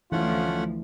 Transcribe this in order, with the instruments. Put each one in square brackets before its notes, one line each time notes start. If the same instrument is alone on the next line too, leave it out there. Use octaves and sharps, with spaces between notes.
[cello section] D2 F3 [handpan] E3 E4 [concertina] A3 C#4 F#5 [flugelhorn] F4